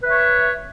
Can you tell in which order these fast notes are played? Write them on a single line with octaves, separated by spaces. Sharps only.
B4 E5 C#5